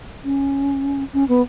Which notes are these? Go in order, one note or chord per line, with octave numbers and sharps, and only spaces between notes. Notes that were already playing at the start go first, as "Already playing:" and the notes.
C#4
C#4
B3